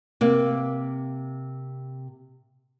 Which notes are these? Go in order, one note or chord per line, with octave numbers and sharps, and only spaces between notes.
C3 A#3